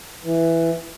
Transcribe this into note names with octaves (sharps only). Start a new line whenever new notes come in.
E3